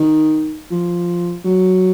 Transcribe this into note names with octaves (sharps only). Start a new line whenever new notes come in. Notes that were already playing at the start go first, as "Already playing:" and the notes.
Already playing: D#3
F3
F#3